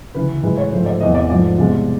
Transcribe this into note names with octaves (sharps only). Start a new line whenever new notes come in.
D2 C#3 E3 B4
A2 E3 G#3 B4
C#5
G#2 F3 A3 C5
D5
E2 C3 E3 A3 D#5
D5
G#2 F3 A3 D5
C2 B2 G#3